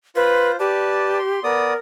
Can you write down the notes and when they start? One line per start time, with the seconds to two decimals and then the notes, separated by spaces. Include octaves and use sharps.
0.16 F4 B4 C5
0.60 G4 B4 D5 A5
1.19 C6
1.44 B3 A#4 D5 D#6